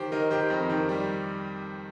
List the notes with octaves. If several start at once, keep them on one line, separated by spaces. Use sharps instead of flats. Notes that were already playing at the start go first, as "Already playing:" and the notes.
Already playing: D#3 G4 C5
D#3 A#4 D#5
D#3 G4 C5
F2 A#4
D#3 G4
G3